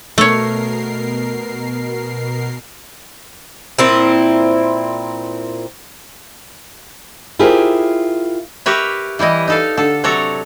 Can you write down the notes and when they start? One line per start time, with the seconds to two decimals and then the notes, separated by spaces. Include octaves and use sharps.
0.18 B2 A3 A#4 C#5 C7
3.79 A#2 C4 E4
7.39 E4 F4 G4 G#4 A#4 C5
8.66 G4 A#4 B4 C#5 E5
9.19 E3 G3 E4 D#5
9.48 D#4 A4 F5
9.77 D3 A4
10.04 C3 F#3 A4 C#5 D5 A#5